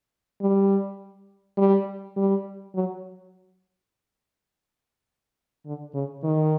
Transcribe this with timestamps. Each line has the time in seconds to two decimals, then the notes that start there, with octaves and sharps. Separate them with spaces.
0.42 G3
1.58 G3
2.17 G3
2.75 F#3
5.66 D3
5.94 C#3
6.24 D#3